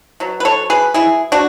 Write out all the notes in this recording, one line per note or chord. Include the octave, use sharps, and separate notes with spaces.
B2 F#3
B4
A4 C#5
G#4 B4
E4 G#4
D4 F#4